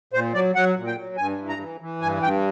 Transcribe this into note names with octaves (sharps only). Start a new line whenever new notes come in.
A#2 C5
F#3 D5
F#3 F#5
A#2
G5
F#3
G2 G#5
E3
A#5
E3
E3
G2 G#5
G2 G5